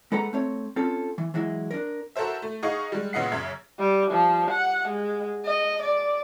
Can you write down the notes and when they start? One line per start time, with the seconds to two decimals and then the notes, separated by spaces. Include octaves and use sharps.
0.12 G#3 A4 B4 F#5 A#5
0.33 A3 C4 C#5
0.76 C4 C#4 F4 A4
1.18 E3
1.34 E3 F#3 G#3 E4
1.71 D4 A#4
2.16 F#4 A4 A#4 C5 E5
2.42 A3
2.63 D#4 G#4 D#5 F5 F#5 C#6
2.92 G3 G#3
3.13 A#2 C#3 B3 D#5 F#5 C7
3.32 F#2 C#3 E5 G#6
3.79 G3
4.11 F3
4.50 F#5
4.88 G#3
5.45 D#5
5.82 D5